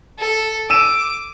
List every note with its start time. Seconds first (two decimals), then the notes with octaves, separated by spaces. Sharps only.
0.19 A4
0.70 D6 E6 D#7 E7